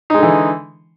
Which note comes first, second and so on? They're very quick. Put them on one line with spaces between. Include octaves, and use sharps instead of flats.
D#4 G#3 D3 E3